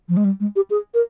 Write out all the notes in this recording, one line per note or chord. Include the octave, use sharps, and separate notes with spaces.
F3
G#3
G3
G#3
G4
G#4
A#4